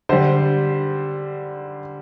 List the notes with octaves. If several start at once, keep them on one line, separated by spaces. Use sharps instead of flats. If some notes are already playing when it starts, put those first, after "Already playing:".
D3 G3 C5